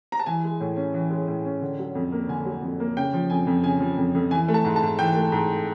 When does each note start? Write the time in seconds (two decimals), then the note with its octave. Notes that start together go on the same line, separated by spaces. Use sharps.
0.12 A#5
0.19 A5
0.26 E3 G#5
0.44 G#3
0.60 A2
0.77 C#4
0.94 E3
1.10 G#3
1.28 A2
1.45 C#4
1.62 D3
1.79 F#3
1.95 F2
2.12 A#3
2.28 D3 G#5
2.45 F#3
2.62 F2
2.80 A#3
2.97 C#3 G5
3.13 F3
3.30 F2 G#5
3.47 F2
3.63 C#3 G#5
3.80 F3
3.97 F2
4.15 F2
4.31 E3 G#5
4.48 A3
4.54 A5
4.64 G#2
4.76 A5
4.82 G#2
4.99 E3 G5
5.15 A3
5.32 G#2